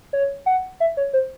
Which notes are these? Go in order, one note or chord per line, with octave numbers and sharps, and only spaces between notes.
C#5
F#5
E5
C#5
C5